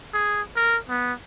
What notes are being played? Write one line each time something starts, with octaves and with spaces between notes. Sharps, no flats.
G#4
A#4
B3